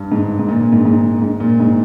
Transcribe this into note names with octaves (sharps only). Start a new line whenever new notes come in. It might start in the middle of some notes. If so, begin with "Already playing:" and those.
Already playing: G2
G#2
G#2
A#2
A#2
G#2
G#2
G#2
A#2
G#2